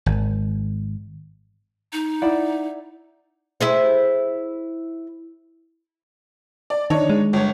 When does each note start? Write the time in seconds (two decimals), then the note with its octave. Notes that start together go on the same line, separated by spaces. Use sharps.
0.06 G#1
1.93 D#4
2.22 E4 D5 F#5
3.61 E4 G#4 C5
6.70 D5
6.90 D#3 D4 D#4 C#5
7.10 G#3
7.33 G1 C#5